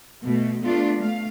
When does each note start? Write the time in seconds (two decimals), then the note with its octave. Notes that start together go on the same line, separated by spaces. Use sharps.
0.22 B2 A3
0.63 A3 B3 D4 F4
0.99 A3 F5